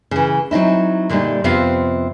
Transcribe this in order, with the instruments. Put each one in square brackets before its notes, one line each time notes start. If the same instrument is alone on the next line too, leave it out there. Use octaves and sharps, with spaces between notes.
[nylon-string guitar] C#3 E3
F#3 C4 D#4 E4
A#2 D3 G3 A3 D#4
F2 C3 B3 C4 F4 F5